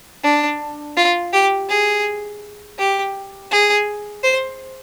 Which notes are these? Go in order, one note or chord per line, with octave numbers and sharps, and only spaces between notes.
D4
F4
G4
G#4
G4
G#4
C5